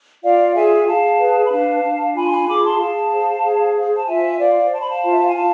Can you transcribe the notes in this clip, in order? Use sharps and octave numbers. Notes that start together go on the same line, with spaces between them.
F4 D5 F5
G#4 E5 G#5
G#4 F5 A5
B4
B5
D4 F5 A5
D4
F4 G#5 B5
C6
G#5 B5
G#4 B5 D6
A5 C6
G#4 F5 A5
C5
G#4
C5
A5
F4 E5 G#5
C5 D5 F5
C5 A5
B5
F5 A5
F4
E5
F5
G#5
F4 F5 A5